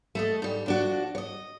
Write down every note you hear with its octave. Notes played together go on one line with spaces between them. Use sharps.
A3 A4 D#5
G#2 G3
F3 D4 F#4
C#5 D#5